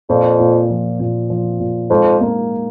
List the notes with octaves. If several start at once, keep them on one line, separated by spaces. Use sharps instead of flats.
F2 A#2
A#2
F3
A#2
F3
A#2
F2 G#2
A#3